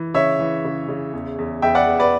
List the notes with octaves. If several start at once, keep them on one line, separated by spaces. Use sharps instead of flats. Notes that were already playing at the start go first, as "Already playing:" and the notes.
Already playing: E3
C#3 C#5 E5
E3
C#3
C#3
E2
E2
E2 E5 G5
D5 F#5
E2
B4 D5